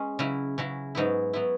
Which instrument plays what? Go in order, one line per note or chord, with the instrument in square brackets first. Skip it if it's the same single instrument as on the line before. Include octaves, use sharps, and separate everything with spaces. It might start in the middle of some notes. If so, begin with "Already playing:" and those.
Already playing: [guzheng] G#3 C#4
C#3 F#3 E4
C#3 F#3 E4
G#2 F#3 B3 E4
F#3 B3 E4